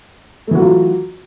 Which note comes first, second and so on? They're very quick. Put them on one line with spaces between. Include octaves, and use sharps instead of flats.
A3 E3 F#4 F#3 F4